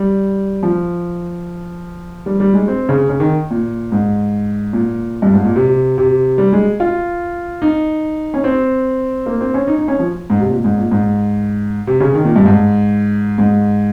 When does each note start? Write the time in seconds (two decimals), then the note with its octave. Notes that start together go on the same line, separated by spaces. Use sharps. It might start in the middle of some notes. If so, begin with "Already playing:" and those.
Already playing: G3
0.63 F3
2.26 G3
2.40 G3
2.54 G#3
2.68 C4
2.89 C#3
3.10 C#3
3.20 D#3
3.51 A#2
3.92 G#2
4.73 A#2
5.22 G2
5.34 G#2
5.45 A#2
5.56 C3
5.98 C3
6.38 G3
6.53 G#3
6.80 F4
7.62 D#4
8.34 C#4
8.44 C4
9.26 A#3
9.41 C4
9.54 C#4
9.68 D#4
9.79 D#4
9.88 C#4
9.99 F3
10.30 G#2
10.40 C3
10.50 A#2
10.64 G#2
10.78 A#2
10.91 G#2
11.87 C3
12.00 C#3
12.14 D#3
12.25 A#2
12.36 G2
12.45 G#2
13.38 G#2